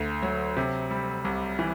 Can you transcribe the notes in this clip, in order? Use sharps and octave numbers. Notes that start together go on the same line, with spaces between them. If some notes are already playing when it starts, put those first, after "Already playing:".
Already playing: D2 A3
F#3
C3
G3
C2
E3